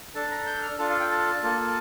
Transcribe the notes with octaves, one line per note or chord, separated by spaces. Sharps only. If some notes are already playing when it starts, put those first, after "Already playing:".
D4 A4 A5
A#5
G6
F6
D4 F4 A4 A5
F5
G5
A5
A#3 F4 A4